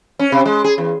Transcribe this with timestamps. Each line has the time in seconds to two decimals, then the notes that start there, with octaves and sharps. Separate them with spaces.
0.19 C#4
0.32 C3
0.46 G#3
0.64 G#4
0.78 E2